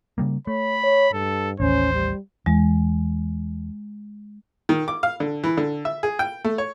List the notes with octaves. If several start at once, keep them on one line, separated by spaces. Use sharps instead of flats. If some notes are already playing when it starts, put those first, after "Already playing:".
C#3 G3 A#3
A3 C#5 B5
C#5
G2 A4
A1 D#2 C#4 C5
G3
E2 G#3
D#3
D6
F5
D3
E3
D3
E5
G#4
G5
A3
C#5